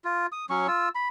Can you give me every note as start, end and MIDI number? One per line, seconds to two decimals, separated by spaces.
0.04 0.27 65
0.32 0.45 87
0.50 0.67 54
0.50 0.67 61
0.50 0.67 85
0.68 0.89 65
0.68 0.89 88
0.95 1.09 83